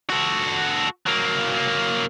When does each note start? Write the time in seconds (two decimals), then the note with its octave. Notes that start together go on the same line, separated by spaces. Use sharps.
0.10 F#4 A4
1.07 F#3 A#3